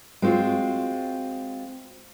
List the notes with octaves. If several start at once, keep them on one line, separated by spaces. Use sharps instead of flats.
G#3 C4 F4 F#4